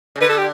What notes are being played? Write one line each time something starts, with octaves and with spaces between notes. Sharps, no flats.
C#3
D3 B4
A4
G4